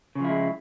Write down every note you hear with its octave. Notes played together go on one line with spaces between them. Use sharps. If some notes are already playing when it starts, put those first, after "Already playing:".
C#3 F3 G#3 E4